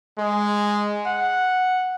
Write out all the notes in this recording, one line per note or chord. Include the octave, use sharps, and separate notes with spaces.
G#3
F#5